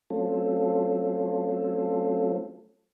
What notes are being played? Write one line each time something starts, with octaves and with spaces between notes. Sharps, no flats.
F#3 A3 C4 C#4 F4 A4